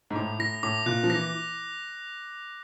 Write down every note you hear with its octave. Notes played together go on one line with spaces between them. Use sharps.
G#2
A2 D6
A2 A#6
A2 D6
A#2 F#6
F3
E3 A#6